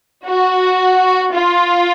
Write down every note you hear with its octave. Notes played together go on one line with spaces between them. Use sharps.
F#4
F4